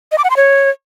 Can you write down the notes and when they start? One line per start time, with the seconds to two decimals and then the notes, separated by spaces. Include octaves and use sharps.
0.12 D#5
0.18 D6
0.24 F#5
0.30 C6
0.37 C#5